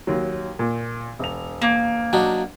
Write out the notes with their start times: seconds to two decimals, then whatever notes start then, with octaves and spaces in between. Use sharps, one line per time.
0.07 D#2 F#3
0.59 A#2
1.19 E1 F7
1.62 A#3
2.13 F#3 D4 D#4